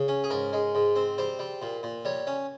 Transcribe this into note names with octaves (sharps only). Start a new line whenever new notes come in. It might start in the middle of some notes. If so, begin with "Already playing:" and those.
Already playing: C#3
C#4
G#4
G#2 A#4
G#3
G#2
C4
G3 C5
G3
A#2
A#2
G3 C#5
C#4